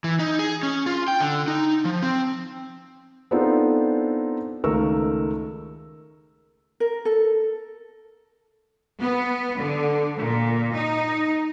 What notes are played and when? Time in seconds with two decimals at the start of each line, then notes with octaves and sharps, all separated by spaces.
0.04 E3
0.19 D#4
0.39 G#4
0.63 C#4
0.86 F4
1.08 G5
1.20 D3
1.48 D#4
1.85 F3
2.03 C4
3.31 B3 C4 D4 D#4 F4 A4
4.64 C#2 D#3 A3 A#4 C#6 E6
6.80 A#4
7.05 A4
8.99 B3
9.58 D3
10.18 A#2
10.73 D#4